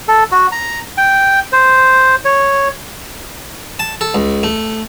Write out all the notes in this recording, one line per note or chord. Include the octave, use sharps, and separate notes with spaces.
A4
F#4
A#5
G5
C5
C#5
A5
A4
C#2
A3